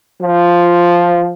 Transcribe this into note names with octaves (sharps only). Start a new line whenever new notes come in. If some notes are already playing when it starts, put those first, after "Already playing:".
F3